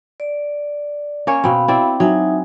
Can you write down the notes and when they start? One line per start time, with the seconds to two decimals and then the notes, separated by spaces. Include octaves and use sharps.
0.20 D5
1.27 A#3 C#4 C#5
1.44 B2 C4 F5 B5
1.68 C4 E4 D5
2.00 F#3 D#4 E5 G#5